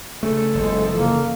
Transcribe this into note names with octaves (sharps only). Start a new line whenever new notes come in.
C#3 A3 G#4 A4
F#1 E2 G#3
C#3 E3 F3 A#3